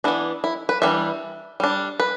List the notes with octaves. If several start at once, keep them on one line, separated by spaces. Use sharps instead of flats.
E3 B3 D4 E4
E4
B4
E3 G3 D4 E5
G3 D4
B4